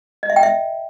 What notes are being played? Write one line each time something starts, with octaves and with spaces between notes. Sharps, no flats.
D#5
E5
G5
E5